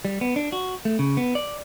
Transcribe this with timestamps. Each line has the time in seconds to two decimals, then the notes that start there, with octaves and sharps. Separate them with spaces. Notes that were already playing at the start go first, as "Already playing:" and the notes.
0.05 G3
0.21 B3
0.36 D4
0.52 F#4
0.85 A3
0.99 C#3
1.17 B3
1.35 D5